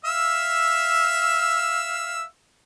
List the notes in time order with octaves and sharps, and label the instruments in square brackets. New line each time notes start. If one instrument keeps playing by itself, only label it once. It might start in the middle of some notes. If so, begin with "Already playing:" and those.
[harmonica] E5 F5 E6